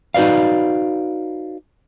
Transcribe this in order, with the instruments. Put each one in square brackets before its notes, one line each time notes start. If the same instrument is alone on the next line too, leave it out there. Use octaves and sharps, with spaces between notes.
[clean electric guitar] D#4 F#4 B4 D5 F5